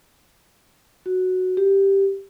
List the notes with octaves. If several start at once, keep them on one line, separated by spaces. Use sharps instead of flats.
F#4
G4